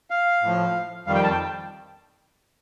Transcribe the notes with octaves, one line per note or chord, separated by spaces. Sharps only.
F5
A2 F3
F2 D#3 G3 F5
G5
A5
G5